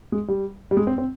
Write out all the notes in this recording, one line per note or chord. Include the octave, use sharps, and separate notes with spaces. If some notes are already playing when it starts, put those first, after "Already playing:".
G#3
G3
G3
G#3
C4
C4